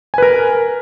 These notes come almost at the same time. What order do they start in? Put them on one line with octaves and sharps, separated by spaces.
G#5 B4 A#4